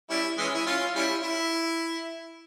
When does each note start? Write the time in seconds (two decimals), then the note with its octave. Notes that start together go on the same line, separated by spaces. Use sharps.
0.10 G3 C#4 E4
0.38 E3 G#3 C#4
0.55 E4
0.67 C#4 F4
0.95 G3 C#4 E4
1.23 E4